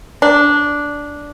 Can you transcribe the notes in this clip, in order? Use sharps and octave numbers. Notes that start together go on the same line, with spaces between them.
D4